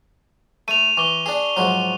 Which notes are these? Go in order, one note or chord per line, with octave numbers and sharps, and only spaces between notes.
A3 D#7 F7
E3 C#6 D6 G7
D4 G#4
G#2 F3 F#3